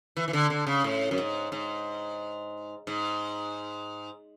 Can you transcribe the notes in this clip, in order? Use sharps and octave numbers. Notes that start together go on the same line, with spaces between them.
E3
E3
D3
D3
C#3
A2
F#2
G#2
G#2
G#2